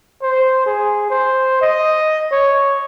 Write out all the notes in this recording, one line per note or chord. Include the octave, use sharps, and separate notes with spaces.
C5
G#4
C5
D#5
C#5